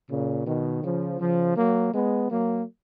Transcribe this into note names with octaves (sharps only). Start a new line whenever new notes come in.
A#2 C#3
B2 D#3
C#3 F3
C#3 F3
F#3 A#3
G#3 B3
F#3 A#3